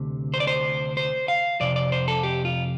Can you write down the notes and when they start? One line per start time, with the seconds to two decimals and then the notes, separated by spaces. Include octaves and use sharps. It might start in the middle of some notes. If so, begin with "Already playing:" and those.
Already playing: D2 C3
0.34 C5
0.40 D5
0.47 C5
0.97 C5
1.28 F5
1.60 F2 C3 D5
1.76 D5
1.92 C5
2.08 A4
2.23 G4
2.45 F4